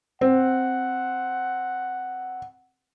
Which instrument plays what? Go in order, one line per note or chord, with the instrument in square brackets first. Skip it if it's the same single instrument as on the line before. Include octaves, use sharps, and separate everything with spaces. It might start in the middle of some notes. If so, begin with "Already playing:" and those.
[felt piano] C4 [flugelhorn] F#5